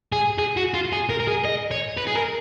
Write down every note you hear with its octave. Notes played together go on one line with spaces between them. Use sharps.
G#4
G#4
F#4
F4
G#4
A#4
A#4
G#4
D#5
C#5
B4
G#4
A#4